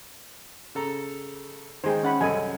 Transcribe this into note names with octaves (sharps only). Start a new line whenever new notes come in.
C#3 A4 A#5
D#3 G#3 G#4 C5 G5
C#4 F#5 B5
C2 F#2 A4 D#5 G#5